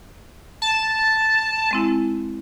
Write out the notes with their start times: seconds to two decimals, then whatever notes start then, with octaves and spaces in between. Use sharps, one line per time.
0.62 A5
1.71 G#3 C4 E4